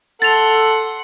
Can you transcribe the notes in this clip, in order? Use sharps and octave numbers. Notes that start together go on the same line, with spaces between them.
A4 F#5 C6 A6 F7